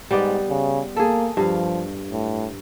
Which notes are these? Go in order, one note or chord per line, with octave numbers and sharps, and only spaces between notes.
G#2 G3 B3 D5
C#3
A#3 G#4 A4
G2 F3 F5
A2